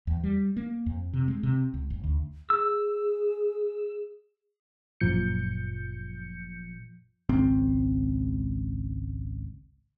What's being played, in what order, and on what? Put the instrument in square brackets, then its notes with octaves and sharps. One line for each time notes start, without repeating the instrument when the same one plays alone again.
[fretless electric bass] E2
G3
A#3
F2
C3
G#3
C3
C#2
F#1
D2
[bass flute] G#4 [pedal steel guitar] E6
[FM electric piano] G1 F#2 A#2 F3 G6 C#7
[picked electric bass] G#1 C#2 C4